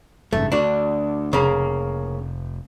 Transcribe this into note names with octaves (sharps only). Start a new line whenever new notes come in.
F#1 G#2 C#3 A3
D2 D4 F#4
F1 C#3 A#3